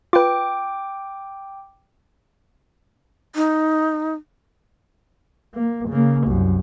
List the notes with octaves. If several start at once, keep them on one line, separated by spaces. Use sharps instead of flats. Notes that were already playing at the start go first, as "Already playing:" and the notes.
F4 B4 G5 D6
D#4
A#3
C#3 A#3
C2 F#2